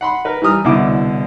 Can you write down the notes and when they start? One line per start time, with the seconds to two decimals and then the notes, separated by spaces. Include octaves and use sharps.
0.01 F#5 B5 C6
0.25 A#4 B4
0.42 E3 G3 A#5 D#6 F6
0.64 C2 B2 D3 E4 D6